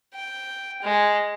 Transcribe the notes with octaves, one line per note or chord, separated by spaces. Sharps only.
G5
G#3